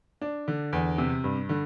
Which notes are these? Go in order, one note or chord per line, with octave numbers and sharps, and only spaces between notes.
D4
D3
E2
C3
G2
D3